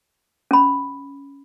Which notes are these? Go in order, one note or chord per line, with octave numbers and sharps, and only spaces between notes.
C#4 B5